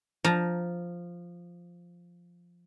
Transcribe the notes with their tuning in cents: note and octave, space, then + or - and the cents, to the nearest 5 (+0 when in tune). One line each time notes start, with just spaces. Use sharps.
F3 +0 A#5 +0